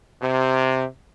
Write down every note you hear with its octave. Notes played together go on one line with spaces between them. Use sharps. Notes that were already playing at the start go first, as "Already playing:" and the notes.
C3